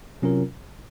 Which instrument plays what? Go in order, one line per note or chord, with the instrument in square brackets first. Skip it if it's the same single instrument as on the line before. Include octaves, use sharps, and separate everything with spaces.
[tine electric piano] C3 F#3 C#4 F4 A#4